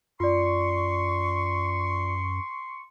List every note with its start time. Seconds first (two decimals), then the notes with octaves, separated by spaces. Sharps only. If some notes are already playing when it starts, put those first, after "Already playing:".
0.20 F#2 F4 D5 C6 C#6